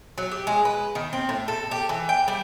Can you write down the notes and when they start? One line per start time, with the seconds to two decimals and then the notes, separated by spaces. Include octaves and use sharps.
0.18 F#3
0.31 G4
0.47 G#3
0.65 B4
0.95 D#3
1.13 C4
1.29 A2
1.48 A4
1.71 G4
1.89 E3
2.09 G5
2.28 G3